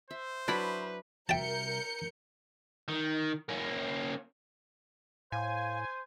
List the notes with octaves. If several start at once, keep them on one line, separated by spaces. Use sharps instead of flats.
C5 E5
F#3 D4 E4 B4 B5
C2 F#4 A#4 E5 G5 A5 G6 C#7
D#3
A#3 C#4
A2 C5 F5 G#5